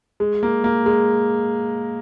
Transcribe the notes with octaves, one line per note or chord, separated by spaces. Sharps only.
G#3
A#3
A#3
G#3